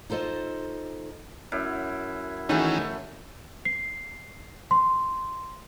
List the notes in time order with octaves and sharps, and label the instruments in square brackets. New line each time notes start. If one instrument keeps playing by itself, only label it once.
[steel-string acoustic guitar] D#4 F4 A4 C5 D#5
[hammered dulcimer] F#2 E4
[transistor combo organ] D#3 E3 C#4 [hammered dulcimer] A3 [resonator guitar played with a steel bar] D#4 F#4 G#4
[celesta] C7
C6